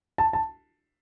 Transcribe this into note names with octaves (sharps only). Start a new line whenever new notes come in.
A5
A5